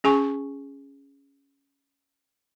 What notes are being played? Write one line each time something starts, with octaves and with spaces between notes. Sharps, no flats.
C#4 G#4 G#5 C#6